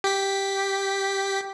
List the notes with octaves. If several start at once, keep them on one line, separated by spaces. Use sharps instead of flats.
G4 B6